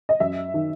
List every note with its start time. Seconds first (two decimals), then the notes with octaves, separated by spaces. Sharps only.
0.09 D#5
0.20 F#2 E5
0.54 D#3